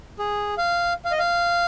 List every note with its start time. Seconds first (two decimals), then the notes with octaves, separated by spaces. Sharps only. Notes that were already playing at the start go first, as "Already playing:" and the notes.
0.19 G#4
0.58 F5
1.05 F5
1.11 D#5
1.19 F5